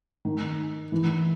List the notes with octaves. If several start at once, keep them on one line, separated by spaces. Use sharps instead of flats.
D#3
E3